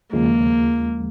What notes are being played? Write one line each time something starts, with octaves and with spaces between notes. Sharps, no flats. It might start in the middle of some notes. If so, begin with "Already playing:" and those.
D#2 C#3 F3 G#3 A#3